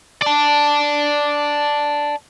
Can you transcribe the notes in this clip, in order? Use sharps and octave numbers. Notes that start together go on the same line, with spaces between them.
D5 A5